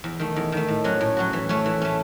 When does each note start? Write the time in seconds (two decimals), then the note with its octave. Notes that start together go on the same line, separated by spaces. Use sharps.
0.04 E2
0.19 D#3 A3
0.36 E2
0.52 D#3 A3
0.68 A2
0.84 F#3 C#4 F#4
1.01 A2
1.17 F#3 C#4 F#4
1.33 E3
1.49 A3 C#4
1.66 E3
1.81 A3 C#4